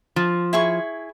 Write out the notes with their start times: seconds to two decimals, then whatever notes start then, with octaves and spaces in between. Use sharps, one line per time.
0.16 F3
0.53 E4 G#4 C#6